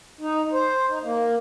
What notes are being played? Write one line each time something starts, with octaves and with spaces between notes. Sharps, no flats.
D#4
C5
D#4
A#3